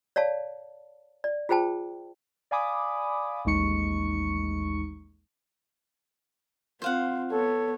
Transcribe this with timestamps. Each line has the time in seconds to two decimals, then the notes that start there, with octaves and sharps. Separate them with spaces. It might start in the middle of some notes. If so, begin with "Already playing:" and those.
0.16 C#5 D5 F5 A5
1.24 D5
1.49 F4 G#4 C5 G5 A5
2.51 D5 F5 G#5 B5 D6 D#6
3.45 A1 D#2 G#3 D#4 C#6 C#7
6.82 C4 F4 C5 F5 F#5
7.32 B3 A4 C#5